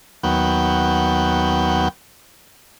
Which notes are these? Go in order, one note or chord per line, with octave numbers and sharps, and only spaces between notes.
D#2 F#3 B3 G5